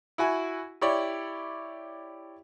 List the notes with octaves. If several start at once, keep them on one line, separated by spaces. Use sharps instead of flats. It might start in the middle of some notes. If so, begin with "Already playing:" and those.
E4 F#4 G#5
E4 G4 C#5 D5